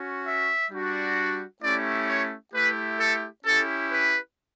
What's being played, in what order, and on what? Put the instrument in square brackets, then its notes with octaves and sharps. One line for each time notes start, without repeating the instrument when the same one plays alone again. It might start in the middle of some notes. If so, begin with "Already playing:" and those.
Already playing: [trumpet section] C#4 F#4
E5
G3 D4 F#4
A3 C#4 E4 G4 D5
C#5
A3 E4 G4 B4
A4
C#4 E4 G4 A4
B4